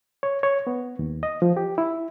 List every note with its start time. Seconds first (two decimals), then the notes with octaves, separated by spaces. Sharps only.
0.23 C#5
0.43 C#5
0.67 B3
0.99 D#2
1.23 D#5
1.42 F3
1.57 G4
1.78 E4